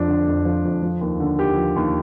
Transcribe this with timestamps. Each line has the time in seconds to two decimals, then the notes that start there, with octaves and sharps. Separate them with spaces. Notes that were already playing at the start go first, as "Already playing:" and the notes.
Already playing: F2 F3 D4
0.08 D3
0.28 F2
0.45 F3
0.65 F2
0.82 F3
1.01 D#2
1.20 D3
1.38 D#2 G4
1.57 F3
1.76 D#2